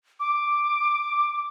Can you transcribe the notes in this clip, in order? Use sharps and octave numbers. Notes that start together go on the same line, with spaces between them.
D6